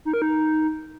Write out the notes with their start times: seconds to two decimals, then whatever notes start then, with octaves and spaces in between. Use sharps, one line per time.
0.05 D#4
0.14 A#4
0.22 D#4